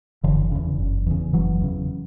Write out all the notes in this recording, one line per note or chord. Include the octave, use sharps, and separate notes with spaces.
F#1 D3 E3
E2 C#3
F#1
E2 C#3
F#1 E3 F#3
E2 C#3